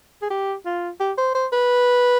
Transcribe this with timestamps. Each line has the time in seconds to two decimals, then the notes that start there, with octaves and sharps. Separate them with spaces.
0.22 G#4
0.30 G4
0.65 F4
1.00 G4
1.18 C5
1.35 C5
1.53 B4